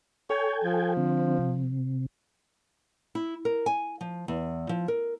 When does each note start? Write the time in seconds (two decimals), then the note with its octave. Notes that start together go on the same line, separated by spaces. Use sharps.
0.30 A4 C#5 G5 G#5
0.64 F3
0.97 D3 C4
1.39 C3
3.15 E4
3.45 A#4
3.66 G#5
4.01 F3
4.28 E2
4.69 F3
4.88 A#4